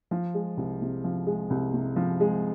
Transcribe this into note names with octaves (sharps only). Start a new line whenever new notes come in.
F3
G#3
C2
C3
F3
G#3
C2
C3
F3
G#3